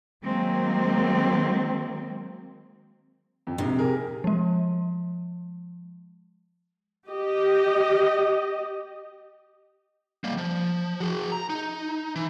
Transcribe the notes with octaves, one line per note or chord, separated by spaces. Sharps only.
D#3 F#3 G#3 A#3 C4
F2
A#1 G#2 C3
G4 G#4 A#4
F3 G#3
G4 D#5
G3 A#3
F3
F#4 G#4
A#5
D#4
E3